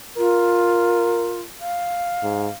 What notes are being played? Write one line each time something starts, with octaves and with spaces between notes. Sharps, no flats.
F4 A#4
F5
G#2